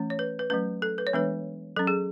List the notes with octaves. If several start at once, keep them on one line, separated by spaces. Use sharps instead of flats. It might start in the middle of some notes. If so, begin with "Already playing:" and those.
Already playing: E3 A3 C#4
C#5
B4
B4
F#3 A3 C#4 B4
A4
B4
C#5
E3 G#3 B3 D4 B4
F#3 C#4 A4
G#4